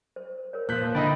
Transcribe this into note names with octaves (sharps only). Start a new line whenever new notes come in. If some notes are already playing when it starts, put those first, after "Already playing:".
C5
A#4 C5 C#5
A#2 F3 B4 F#6 G6 B6
D3 D#4 E4 D5 D#5 G5 B5